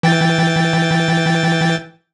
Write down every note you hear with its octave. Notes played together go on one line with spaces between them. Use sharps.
E3 G5 A6